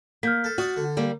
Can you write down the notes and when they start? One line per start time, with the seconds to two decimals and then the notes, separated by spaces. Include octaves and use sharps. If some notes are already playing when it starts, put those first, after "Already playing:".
0.23 A#3 F6 G6 B6
0.44 A4
0.58 F#4 D5 D#6
0.76 D3
0.97 G3 A#3